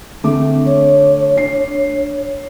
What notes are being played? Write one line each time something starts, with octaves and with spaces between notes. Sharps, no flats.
D3 A3 C4 D6
C#5
D4 C7